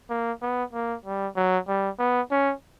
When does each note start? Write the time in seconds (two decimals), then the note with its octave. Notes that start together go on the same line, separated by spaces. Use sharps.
0.10 A#3
0.42 B3
0.73 A#3
1.05 G3
1.36 F#3
1.68 G3
1.99 B3
2.31 C#4